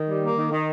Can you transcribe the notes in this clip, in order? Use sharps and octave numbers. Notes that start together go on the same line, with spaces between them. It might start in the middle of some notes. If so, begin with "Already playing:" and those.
Already playing: D#3
G3
A#3
D#3
D#3